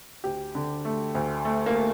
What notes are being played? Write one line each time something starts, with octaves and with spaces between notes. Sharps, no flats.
D2 G4
D3
A3
D2
A3
A#3
A3